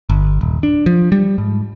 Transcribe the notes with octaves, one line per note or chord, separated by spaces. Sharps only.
G1
D#1
D4
F3
G3
G#2